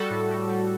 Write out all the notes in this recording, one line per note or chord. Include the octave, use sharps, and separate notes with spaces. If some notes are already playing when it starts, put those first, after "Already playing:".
Already playing: G3 F#4 A4
A2
G3
G3